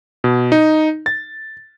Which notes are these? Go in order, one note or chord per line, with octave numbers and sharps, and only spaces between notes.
B2
D#4
A6